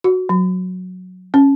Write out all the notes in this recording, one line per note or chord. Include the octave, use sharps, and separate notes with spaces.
F#4
F#3
C#4